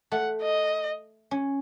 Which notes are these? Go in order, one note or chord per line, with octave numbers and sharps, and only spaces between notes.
A3 F#5
D#5
C#4